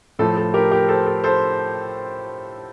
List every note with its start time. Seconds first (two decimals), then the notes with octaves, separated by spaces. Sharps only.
0.19 A2 F3 A3 A4
0.37 A4
0.54 G4 A#4
0.71 G4 A#4
0.89 A4 C5
1.07 A4
1.24 A4 C5